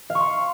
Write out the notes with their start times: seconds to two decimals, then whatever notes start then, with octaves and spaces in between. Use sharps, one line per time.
0.10 F5
0.15 C#6
0.20 C6